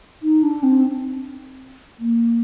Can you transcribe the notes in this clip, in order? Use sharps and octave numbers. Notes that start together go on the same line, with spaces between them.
D#4
D4
C4
A#3